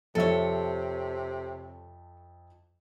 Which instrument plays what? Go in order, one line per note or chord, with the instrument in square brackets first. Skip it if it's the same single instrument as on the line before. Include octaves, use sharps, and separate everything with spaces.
[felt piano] F2 F3 E5 [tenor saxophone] C3 [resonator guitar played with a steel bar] A4 C#5